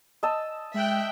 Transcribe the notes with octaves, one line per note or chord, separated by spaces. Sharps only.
D#5 A5 E6
G#3 E5 G5 F#6